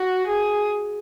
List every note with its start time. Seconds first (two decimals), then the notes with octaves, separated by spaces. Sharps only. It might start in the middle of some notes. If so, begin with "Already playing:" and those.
Already playing: F#4
0.27 G#4